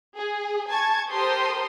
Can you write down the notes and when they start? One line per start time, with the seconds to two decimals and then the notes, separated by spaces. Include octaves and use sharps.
0.16 G#4
0.69 G#5 A5 C#6 G#6
1.11 G4 A4 A#4 C5 C6 D#6